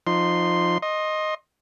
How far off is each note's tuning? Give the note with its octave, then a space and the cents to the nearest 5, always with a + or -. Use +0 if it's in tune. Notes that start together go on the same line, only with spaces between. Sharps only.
F3 +0 D#4 -20 C6 +0
D#5 +0 C6 +25